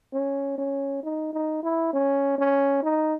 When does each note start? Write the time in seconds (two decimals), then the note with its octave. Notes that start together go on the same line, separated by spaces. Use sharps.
0.13 C#4
0.58 C#4
1.03 D#4
1.33 D#4
1.63 E4
1.93 C#4
2.38 C#4
2.83 D#4